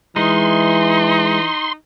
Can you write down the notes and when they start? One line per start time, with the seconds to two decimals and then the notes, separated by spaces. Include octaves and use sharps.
0.16 E3 G#3 D#4 C6